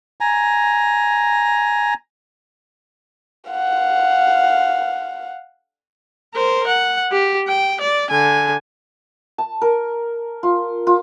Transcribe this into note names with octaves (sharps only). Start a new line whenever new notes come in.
G#5 A#5
F5 F#5
A#4 C5
F#5
G4
G5
D5
D3 G#5
A5
A#4
F4
F4